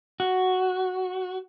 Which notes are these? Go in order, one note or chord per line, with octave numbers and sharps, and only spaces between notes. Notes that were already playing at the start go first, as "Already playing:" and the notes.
F#4